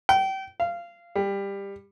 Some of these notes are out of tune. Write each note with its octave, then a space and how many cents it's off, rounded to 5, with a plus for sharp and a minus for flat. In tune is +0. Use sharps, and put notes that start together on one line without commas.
G5 -30
F5 -20
G3 +20